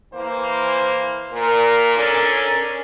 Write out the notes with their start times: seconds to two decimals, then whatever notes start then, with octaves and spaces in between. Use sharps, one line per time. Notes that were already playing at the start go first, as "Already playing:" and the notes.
0.13 E3 A#3 C5
1.31 A#2 A#4
1.96 C#4 D4 A4 A#4